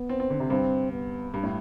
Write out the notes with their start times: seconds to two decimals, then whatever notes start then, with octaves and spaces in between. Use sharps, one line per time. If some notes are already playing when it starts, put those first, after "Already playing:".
Already playing: B3
0.09 C4
0.20 C4
0.30 D3
0.40 C3
0.50 G2 C4
0.92 B3
1.34 G2
1.43 A2